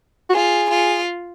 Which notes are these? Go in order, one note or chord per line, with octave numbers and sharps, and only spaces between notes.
F#4
F4 G#4
F4